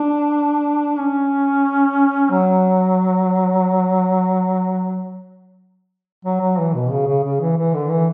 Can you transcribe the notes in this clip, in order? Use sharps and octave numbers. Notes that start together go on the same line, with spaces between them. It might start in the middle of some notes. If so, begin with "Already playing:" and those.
Already playing: D4
C#4
F#3
F#3
F#3
E3
B2
C#3
C#3
C#3
E3
E3
D3
E3